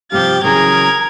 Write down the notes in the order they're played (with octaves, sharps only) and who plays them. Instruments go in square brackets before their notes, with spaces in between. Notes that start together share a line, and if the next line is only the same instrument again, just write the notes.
[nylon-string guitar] G2 C3 F3 [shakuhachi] G4 [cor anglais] F5 [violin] G6 A6
[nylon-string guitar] C#3 E3 F#3 [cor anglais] G#4 [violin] A#4 G#6 [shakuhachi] A#5